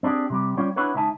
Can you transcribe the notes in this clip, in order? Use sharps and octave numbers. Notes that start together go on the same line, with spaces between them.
C4 D4 F4 G4 G#4
C3 G3 G4
G3 C#4 F4 C#5 D5 G5
B3 D4 E4 F#4 B4 C#5
C#2 D#4 E5 G#5 A5